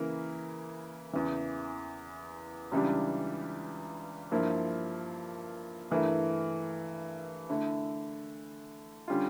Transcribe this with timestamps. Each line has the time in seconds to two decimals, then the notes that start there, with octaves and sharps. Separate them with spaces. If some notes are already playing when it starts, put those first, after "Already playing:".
Already playing: C#3 E3 A#3 E4 A#4
1.13 E2 C#3 E3
2.72 C#2 C#3 E3 G3 D4
4.31 G2 F3 A#3 E4
5.91 G2 E3 A3 E4 A#4
7.49 D3 A3 E4
9.08 D3 G3 C#4 F4